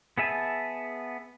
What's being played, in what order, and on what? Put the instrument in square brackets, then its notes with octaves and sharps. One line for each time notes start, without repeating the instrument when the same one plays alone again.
[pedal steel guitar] B3 G#4 E5 G#5 A5